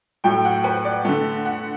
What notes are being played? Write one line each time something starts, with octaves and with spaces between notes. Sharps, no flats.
A2 F#3 A3 G5
F#5
B4
D5
D3 A3
F#5